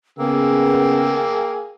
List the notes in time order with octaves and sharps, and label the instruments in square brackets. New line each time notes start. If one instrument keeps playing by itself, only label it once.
[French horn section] C#3 B3 [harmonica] A#3 G#4 E6 [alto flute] G5